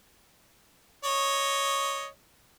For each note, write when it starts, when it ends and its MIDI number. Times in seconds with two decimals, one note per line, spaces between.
1.04 2.06 73
1.04 2.06 75